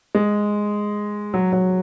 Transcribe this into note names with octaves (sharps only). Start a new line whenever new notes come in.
G#3
F#3
F#3